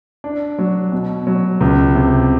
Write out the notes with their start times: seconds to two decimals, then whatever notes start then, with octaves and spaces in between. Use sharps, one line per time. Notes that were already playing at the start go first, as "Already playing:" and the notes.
0.24 D4
0.58 F#3
0.92 B2
1.27 F#3
1.61 C#2
1.95 C3